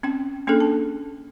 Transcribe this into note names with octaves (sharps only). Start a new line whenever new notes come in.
C4 C#4 G5
A#3 C#4 D4 G#4 A4
A5